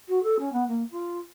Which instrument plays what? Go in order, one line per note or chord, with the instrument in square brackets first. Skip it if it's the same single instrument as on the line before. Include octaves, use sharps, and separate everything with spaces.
[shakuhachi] F#4
A4
C#4
B3
A#3
F4